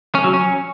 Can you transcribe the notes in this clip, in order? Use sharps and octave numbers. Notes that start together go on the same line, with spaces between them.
C#4
F#3
C#4